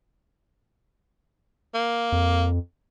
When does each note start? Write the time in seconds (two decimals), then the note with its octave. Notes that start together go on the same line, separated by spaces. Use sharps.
1.75 A#3
2.12 F2